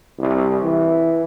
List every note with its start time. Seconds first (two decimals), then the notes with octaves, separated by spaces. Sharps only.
0.19 C2
0.63 E3